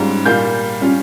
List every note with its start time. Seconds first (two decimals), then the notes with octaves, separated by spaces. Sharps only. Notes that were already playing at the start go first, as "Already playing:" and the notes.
Already playing: G#2 G3 C#4 F4
0.26 A#2 G3 A#3 F4 G6
0.81 G3 C#4 F4